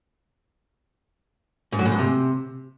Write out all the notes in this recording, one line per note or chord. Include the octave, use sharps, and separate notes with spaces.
G#2
F#3
A2
G#2
C3